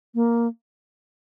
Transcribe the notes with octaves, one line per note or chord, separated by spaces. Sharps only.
A#3